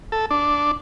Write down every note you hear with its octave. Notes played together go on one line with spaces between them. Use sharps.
A4
D4